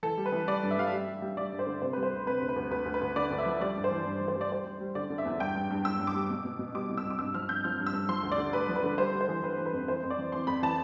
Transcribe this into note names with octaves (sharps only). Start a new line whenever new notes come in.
E3 A4
G3
B4
E3
G3 D5
G2
E5
G3 F5
E5
G3
G3
G3
G3 D5
G2
C5
D3
C3 C5
G3 B4
C5
D2
C3 B4
D2
B4
D2
D2 B4
D2
B4
D2
D3 D5
D2
E5
F3
G3 D5
G2
C5
E3
G2
E3
C5
G3
D5
G3 C5
G3
G3
D3 D5
D3
E5
E2
G2 G5
G2
G2
G2 E6
G2
D6
G3
B2
B2
B2
G3 D6
C2
E6
C2
D6
G2 E6
F3 F6
G2 G6
F3 F6
G2
E6
G2
F3 C6
D2
D5
D3
D2 B4
F3
B4
D3
G3 C5
G3
C5
E3
E3 B4
E3
B4
F2
E3 C5
F2
D5
E3
E3 C6
F2 B5
E3 A5